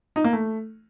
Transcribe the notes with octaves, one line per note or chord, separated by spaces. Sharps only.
D#4
A#3
A3